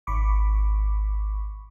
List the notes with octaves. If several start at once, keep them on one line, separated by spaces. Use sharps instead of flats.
G#1 B5 C#6 D6